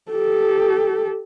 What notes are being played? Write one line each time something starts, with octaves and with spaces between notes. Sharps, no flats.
G4 A4